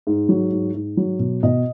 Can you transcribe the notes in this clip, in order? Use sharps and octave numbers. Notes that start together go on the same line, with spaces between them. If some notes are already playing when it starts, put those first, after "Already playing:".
G#2
F#3
G#2
G#2
F#3
B2
B2 D#5